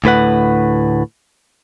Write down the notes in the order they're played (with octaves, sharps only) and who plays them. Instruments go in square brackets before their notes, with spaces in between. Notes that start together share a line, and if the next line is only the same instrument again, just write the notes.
[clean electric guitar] D2 A2 B4 F#5